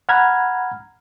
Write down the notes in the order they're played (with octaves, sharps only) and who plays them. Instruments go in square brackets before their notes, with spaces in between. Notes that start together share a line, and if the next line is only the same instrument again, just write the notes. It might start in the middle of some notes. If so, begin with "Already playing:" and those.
[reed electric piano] F#5 A#5 B5 F6 G#6